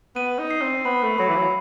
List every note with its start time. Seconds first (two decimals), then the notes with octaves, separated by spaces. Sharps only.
0.15 B3 D#7
0.39 D#4
0.51 C7
0.62 C4
0.85 B3 B5
1.02 A3
1.18 F#3 B5
1.28 E3
1.36 F#3